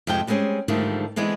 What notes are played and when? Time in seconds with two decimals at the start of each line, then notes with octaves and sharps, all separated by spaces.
0.07 F2 C3 G#3 C5 G5
0.27 G3 G#3 C4 C#4 G#4
0.68 G#2 D3 D#3 F3 G3 A3
1.16 D3 E3 G#3 B3 C4